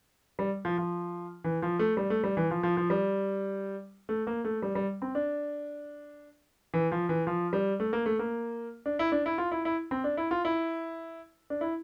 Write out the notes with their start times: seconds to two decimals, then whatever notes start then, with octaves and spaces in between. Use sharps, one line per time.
0.39 G3
0.65 F3
0.78 F3
1.44 E3
1.62 F3
1.79 A3
1.97 G3
2.10 A3
2.24 G3
2.37 E3
2.51 F3
2.63 F3
2.77 F3
2.90 G3
4.09 A3
4.27 A#3
4.45 A3
4.62 G3
4.75 G3
5.02 C4
5.15 D4
6.74 E3
6.92 F3
7.09 E3
7.27 F3
7.53 G3
7.80 A3
7.93 A#3
8.06 A3
8.19 A#3
8.86 D4
8.99 E4
9.12 D4
9.26 E4
9.38 F4
9.51 E4
9.65 E4
9.91 C4
10.04 D4
10.17 E4
10.31 F4
10.45 E4
11.50 D4
11.61 E4